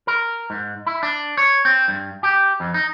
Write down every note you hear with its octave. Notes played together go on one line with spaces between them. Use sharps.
A#4
G#2
E4
D4
C#5
C4
G2
G4
F2
D#4